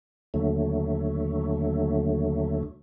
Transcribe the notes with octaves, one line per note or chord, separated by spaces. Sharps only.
D#2 D3 F#3 A3